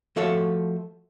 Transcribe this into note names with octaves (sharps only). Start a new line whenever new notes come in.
F3 A3 F#4 A4 C#5